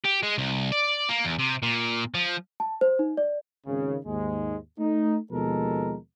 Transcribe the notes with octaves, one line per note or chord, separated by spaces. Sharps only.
G4
G#3
C2
D5
A#3
E2
C3
A#2
F3
A5
C5
D#4
D5
G#1 C#3
D#2 G#2 G#3
A3 D#4
D#2 B2 F3 G#3 A4 A#4